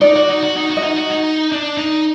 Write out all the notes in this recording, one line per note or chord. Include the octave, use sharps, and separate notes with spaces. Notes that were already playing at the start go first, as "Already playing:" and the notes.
D#4 D5
F#4
D#4
F#4
D#4
F#4
D#5
D#4
F#4
D#4
D4
D#4